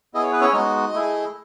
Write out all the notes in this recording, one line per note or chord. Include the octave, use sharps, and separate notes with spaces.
B3 E4 G#4 D#5
C#5
B4
C#4 C#5
G#3 B3 D#4 F#4 D#5
A3 E4 G#4